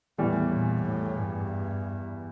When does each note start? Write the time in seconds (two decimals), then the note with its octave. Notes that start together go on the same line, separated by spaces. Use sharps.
0.18 E2 A2 E3 G3
0.50 A#2
0.82 A2
1.14 G2